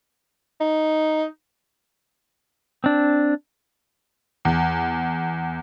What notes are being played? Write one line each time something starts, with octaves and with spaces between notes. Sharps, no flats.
D#4
C4 D4
E2